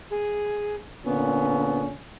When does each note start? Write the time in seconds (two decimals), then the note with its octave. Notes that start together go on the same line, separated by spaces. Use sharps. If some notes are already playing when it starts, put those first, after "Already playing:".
0.11 G#4
1.04 A#2 D3 B3 C#4